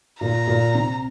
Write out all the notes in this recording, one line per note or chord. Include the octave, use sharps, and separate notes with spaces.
A#2 A#5
A#2
C3